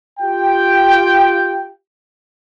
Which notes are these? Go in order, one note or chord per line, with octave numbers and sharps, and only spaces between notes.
F4 G4 G5